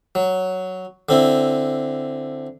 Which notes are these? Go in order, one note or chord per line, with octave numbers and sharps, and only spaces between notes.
F#3
D3 C4 E4